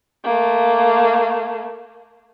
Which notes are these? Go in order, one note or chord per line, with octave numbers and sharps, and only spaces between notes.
A3 A#3